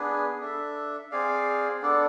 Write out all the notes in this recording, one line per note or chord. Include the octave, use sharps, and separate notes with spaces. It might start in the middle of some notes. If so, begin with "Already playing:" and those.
Already playing: B3 D4 G#4 B4
D4 A4 E5
C4 G#4 D5 F5
B3 D4 A4 D5